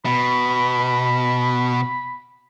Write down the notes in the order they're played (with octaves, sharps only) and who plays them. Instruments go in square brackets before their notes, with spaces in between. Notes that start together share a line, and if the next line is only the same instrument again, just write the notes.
[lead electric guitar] B2 [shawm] B5